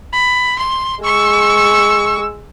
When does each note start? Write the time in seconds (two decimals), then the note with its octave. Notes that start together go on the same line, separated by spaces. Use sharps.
0.13 B5
0.59 C6
1.04 G#3 C#6 E6